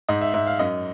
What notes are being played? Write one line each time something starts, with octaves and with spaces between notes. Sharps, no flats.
G#2 D#5
E5
G#2 E5
F5
F#2 D#5